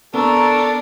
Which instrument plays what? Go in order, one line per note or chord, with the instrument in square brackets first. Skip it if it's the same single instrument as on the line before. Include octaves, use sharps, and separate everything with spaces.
[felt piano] B3 [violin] D4 A#4 [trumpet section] A4 [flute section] A#5 C#6 E6